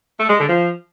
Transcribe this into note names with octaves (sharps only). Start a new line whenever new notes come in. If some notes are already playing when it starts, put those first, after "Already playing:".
A3
G#3
D3
F3